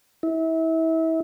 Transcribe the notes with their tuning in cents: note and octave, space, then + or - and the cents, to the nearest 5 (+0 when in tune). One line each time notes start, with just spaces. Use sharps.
E4 -30